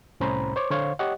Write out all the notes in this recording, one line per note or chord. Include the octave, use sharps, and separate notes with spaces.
C2 A2 C#4 C5 A#5 B5
C5 C#5 D6
D3 C5 C#5 F5 C6
G4 C#5 D#5 F#5